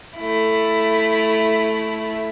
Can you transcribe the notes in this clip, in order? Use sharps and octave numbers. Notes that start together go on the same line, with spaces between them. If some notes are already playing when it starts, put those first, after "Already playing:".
A3 E4